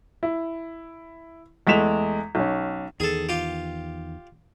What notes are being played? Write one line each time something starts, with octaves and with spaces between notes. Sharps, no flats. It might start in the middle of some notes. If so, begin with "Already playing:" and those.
E4
E2 G#3 A3 B6 E7 F7
B1 C#4
E2 D#3 G#4 A4
F4 G4